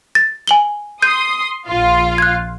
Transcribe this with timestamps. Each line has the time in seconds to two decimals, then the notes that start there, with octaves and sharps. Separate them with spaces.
0.15 A6
0.47 G#5 F#7 G7
1.02 C6 D#6 G6 D#7
1.67 A#1 F4 F5
2.18 F#6 G#6